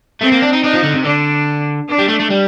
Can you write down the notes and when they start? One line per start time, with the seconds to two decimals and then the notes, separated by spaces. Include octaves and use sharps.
0.21 A3 C4
0.32 A#3
0.42 D4
0.53 D#4
0.63 D4 D#4
0.73 F3
0.83 D3
0.94 C3
1.04 D3 D4
1.89 D4
1.99 G3
2.08 A3
2.19 A3
2.30 G3